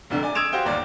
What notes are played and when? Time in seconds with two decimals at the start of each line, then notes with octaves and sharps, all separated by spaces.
0.10 F1 C2 D3
0.23 D5 G#5
0.35 D#6 E6 G#6 D7 E7 F7
0.52 F#4 G4 C5 F5 G5
0.65 G1 D#2 D5